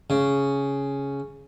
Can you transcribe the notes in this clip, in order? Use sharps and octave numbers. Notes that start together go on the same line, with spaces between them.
C#3